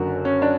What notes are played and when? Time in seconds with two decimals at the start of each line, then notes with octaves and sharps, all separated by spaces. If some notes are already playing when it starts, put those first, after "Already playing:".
Already playing: F#1 F#2 D3 F#4 A#4
0.25 C#4
0.42 D4